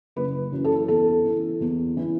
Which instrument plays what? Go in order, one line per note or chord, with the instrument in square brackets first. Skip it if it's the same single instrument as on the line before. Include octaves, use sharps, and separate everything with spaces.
[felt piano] F#1 B4
F#2 E3
A4
E2 A4
E3
E2
E3